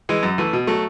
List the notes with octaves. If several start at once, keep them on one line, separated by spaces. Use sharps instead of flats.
E3 G#3
F#2
E3 A3
B2
F#3 A3